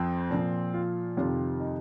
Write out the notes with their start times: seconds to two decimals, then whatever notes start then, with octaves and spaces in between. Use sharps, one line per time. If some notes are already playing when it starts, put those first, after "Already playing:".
Already playing: F2 F3 C4
0.30 A#2 F3
0.74 F4
1.17 F2 C3 D#3 F4
1.60 D#4